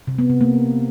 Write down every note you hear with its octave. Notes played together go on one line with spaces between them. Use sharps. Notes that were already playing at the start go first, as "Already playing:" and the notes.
C3
B3
C3
A#3